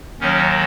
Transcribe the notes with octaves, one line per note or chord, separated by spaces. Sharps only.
D#2 D#3 F#3 C#4